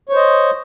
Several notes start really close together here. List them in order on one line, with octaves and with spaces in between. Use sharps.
C#5 C5 D#5